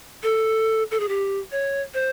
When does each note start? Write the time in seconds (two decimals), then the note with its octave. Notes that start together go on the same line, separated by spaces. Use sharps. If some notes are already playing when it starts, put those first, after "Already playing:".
0.23 A4
0.91 A4
1.00 G#4
1.09 G4
1.52 C#5
1.94 C5